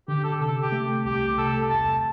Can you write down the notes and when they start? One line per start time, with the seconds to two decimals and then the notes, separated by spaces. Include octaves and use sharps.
0.08 D3 G4
0.24 A4
0.40 C3 A4
0.62 G4
0.72 A3
1.05 C2 G4
1.37 C3 A4
1.70 E2 A5